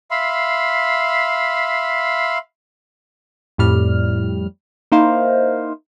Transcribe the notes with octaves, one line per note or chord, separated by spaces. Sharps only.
E5 F5 B5 C6
F2 A2 G3 F6
A#3 D#4 E4 C5 F5